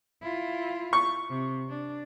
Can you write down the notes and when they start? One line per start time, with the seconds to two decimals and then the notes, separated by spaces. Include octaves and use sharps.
0.22 E4 F4
0.93 C#6
1.30 C3
1.69 D4